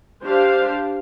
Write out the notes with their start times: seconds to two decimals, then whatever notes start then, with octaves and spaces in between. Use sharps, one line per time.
0.24 D4 G4 C5 F5